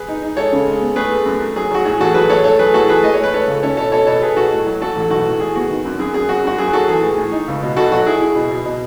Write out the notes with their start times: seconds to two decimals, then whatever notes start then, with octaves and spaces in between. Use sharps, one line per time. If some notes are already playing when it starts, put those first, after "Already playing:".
Already playing: G#4 B4
0.08 D#4
0.22 D#4
0.37 G#3 A4 C#5
0.52 C#3
0.67 G#3
0.81 B3
0.96 A3 G#4 B4
1.11 A3
1.26 F#2
1.41 A3
1.56 F#3 G#4
1.71 F#3 F#4
1.85 A2 G#4
2.00 A1 F#4 A4
2.14 F#3 G#4 B4
2.29 A3 A4 C#5
2.44 A3 A4 C#5
2.59 F#3 G#4 B4
2.74 A2 F#4 A4
2.88 E3 G#4 B4
3.03 A3 D#5
3.14 C#5
3.19 A3 B4
3.34 G#3 A4 C#5
3.47 C#2
3.62 C#4 A4 C#5
3.77 B2 A4 C#5
3.92 B2 A4 C#5
4.07 B2 A4 C#5
4.22 B2 G#4 B4
4.36 B2 F#4 A4
4.52 A2
4.66 F#3
4.82 F#3 F#4 A4
4.96 A1
5.10 B1 F#4 A4
5.25 A2
5.40 A2 G#4
5.56 B3 F#4
5.69 D#3
5.85 F#2
5.99 F#2 G#4
6.14 F#2 G#4
6.29 F#3 F#4
6.44 F#2 F#4
6.58 F#2 G#4
6.73 F#3 F#4 A4
6.88 E3 G#4
7.03 A2
7.18 A2
7.32 D#4
7.48 C#2
7.62 B2
7.77 B2 F#4 A4
7.92 F#3 F#4
8.06 E4 G#4
8.21 E4
8.35 B2
8.51 B2
8.65 B2